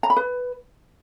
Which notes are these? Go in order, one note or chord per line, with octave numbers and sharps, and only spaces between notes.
A#5
B5
B4